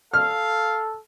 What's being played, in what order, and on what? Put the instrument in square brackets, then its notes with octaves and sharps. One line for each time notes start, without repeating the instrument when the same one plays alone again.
[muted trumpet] A4 [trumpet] F5 [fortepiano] F6